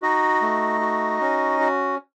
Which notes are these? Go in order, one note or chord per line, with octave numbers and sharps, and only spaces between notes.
D#4 F#4 D#5
A3
F#4
C#4
F#4